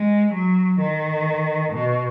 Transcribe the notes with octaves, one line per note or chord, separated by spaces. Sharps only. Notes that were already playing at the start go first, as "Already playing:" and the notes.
Already playing: G#3
F#3
D#3
B2